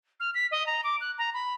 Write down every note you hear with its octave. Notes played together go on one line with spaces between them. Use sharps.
F6
B6
D#5
A#5
D6
F#6
A#5
B5